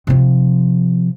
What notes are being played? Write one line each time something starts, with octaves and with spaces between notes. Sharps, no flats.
C3 F3